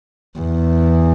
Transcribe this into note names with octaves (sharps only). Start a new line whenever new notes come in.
E2